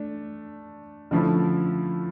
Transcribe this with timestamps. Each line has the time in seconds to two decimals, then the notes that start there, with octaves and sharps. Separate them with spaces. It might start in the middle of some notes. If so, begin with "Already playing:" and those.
Already playing: A3 D4
1.11 D3 F3 A3 C#4 E4